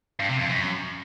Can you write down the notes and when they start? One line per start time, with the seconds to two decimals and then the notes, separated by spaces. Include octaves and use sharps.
0.20 G2
0.30 C3
0.39 F2
0.49 F#2